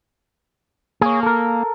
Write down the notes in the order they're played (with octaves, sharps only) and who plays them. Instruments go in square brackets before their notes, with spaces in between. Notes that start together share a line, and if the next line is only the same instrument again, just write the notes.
[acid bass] A#3 [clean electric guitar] G#4 C#5
[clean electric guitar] A4 A#4